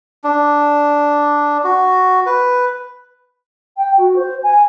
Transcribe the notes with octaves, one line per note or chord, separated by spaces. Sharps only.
D4
F#4
B4
G5
F#4
C5
G#5